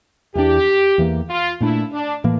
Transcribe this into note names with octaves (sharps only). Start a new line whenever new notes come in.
E2 E3 A#3 D4 G4
E2 E3 A#3
F4
A#2 A3 D4 E4
D4
A2 E3 A#3